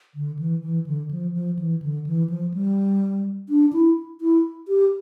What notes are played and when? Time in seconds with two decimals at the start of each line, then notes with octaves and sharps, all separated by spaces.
0.15 D3
0.39 E3
0.63 E3
0.86 D3
1.11 F3
1.34 F3
1.59 E3
1.82 D3
2.07 E3
2.30 F3
2.54 G3
3.49 D4
3.73 E4
4.21 E4
4.68 G4